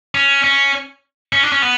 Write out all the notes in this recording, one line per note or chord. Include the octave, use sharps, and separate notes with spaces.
C#4
C#4
C#4
D4
C#4
B3